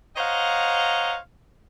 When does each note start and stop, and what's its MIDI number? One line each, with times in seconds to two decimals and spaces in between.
0.16 1.17 72
0.16 1.17 73
0.16 1.17 75
0.16 1.17 77
0.16 1.17 78
0.16 1.17 82